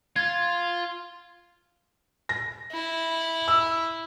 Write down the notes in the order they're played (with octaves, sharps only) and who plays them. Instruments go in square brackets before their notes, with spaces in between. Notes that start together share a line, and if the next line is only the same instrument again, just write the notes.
[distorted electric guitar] F4 [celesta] G#6
[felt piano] A#6
[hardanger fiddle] E4
[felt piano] E6